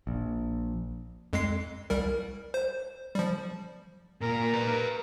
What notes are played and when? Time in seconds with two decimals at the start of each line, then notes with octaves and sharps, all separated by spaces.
0.07 A#1
1.33 F2 G#3 C7
1.90 C2 G3 A#4
2.54 C5
3.15 F3 G3
4.21 A#2 A#4
4.54 B4 D5